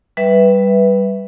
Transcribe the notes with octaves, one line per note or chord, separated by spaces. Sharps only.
G3 B4 E5